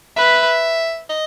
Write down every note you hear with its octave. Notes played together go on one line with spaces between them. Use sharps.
B4 E5
D#5